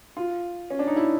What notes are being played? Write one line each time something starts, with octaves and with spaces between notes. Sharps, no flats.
F4
C#4
D4
D#4
E4